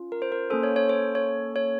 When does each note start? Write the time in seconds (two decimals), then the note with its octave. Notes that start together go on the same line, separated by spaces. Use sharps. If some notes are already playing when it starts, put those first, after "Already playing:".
Already playing: C#4 F4
0.12 A#4
0.22 C5
0.32 A#4
0.50 A#3 C#4 A4 C5
0.63 C#5
0.76 C#5
0.89 C5
1.15 C#5
1.56 C#5